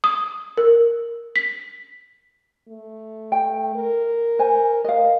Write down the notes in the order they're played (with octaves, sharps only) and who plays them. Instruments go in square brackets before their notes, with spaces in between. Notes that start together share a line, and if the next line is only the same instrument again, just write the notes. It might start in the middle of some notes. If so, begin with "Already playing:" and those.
[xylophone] D#6
A#4
B6
[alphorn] A3
[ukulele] G5
[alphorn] A#4
[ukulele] C5 G#5
[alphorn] A#4 [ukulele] D#5 F5